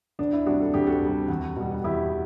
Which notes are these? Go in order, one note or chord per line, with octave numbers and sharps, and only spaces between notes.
D2 D4
E4
C3 G3 D4 F#4
A4
D2 G4
F#4 A4
C3 G3
E2
B2 G3
E2 E4 G4